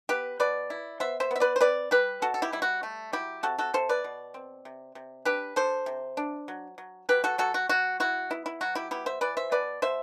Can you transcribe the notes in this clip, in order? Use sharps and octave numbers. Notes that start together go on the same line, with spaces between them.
B3 G4 B4
B2 B4 D5
E4
B3 C5 E5
C5 E5
B3 E5
B4 D5
C5
C4 B4 D5
G3 G4 B4
B2 F#4 A4
A4
E4 G4
G3 E4
F#4
A3
F#3 E4 G4
C3 F#4 A4
F#4 A4
C3 A4 C5
B4 D5
B2
C4
C3
C3
D4 G4 B4
D4 A4 C5
C3
D4
F#3
F#3
F#3 G4 B4
F#4 A4
F#3 F#4 A4
F#4
F#3 F#4
E4 F#4
B3 E4
E4
F#3 F#4
E4 G4
B3 E4 G4
C5 E5
E3 B4 D5
C5 E5
B2 B4 D5
B2 C5 E5